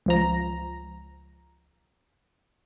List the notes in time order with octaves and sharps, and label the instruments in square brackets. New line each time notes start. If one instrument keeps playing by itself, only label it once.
[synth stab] C#2 F3 A#5